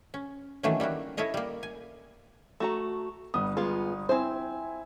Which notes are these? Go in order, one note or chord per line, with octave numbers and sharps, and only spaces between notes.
C#4
D#3 E3 F#3 A3 A#3 C#4
G3 A#3 E4 F#4
E4 A4 C#5 D#5 F5
G3 A#3
G#5
A3 F#4 A#5
G1 B3 D#6
G#3 B3 F4
C4 E4 C5 G#5